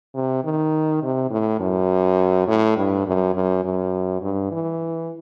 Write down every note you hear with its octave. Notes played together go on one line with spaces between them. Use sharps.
C3
D#3
C3
A2
F#2
A2
G2
F#2
F#2
F#2
G2
E3